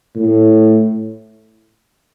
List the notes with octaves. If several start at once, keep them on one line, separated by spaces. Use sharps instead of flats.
A2